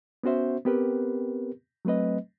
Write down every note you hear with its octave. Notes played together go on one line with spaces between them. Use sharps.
B3 C#4 F#4 C5 E5
B3 C4 G4 A#4 B4
F#3 A3 C4 B4 D#5